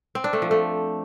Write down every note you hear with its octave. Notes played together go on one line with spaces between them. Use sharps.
C4
D4
A3
F3
A3